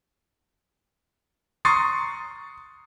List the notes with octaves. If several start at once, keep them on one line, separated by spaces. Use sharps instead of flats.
A#5 C6 C#6 D#6 A6 C7